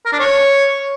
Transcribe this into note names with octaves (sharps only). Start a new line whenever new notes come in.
A#4
D4
C#5